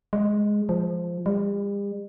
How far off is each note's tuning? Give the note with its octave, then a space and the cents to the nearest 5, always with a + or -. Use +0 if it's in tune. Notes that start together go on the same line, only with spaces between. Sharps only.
G#3 +0
F3 -5
G3 +45